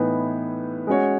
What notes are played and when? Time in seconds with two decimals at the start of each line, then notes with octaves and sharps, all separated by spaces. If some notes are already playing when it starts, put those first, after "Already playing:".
Already playing: A2 E3 B3 D#4
0.87 G#3 C#4 F#4 C#5